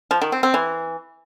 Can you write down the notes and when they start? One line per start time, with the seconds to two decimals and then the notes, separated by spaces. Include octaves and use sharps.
0.11 F3
0.22 D#3
0.32 C4
0.43 C4
0.54 E3